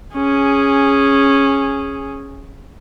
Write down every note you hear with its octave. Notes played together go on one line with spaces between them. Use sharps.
C#4 G#4